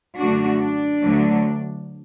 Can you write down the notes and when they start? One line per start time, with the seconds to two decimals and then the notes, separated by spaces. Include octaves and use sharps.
0.18 F#2 D3 A3 D4 F#4
0.61 D4
1.04 D2 D3 F#3 A3